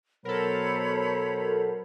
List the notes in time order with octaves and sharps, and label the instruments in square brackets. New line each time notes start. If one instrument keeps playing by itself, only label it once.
[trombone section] B2 F#3 [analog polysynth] A4 A#4 [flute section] C5 C#5 B5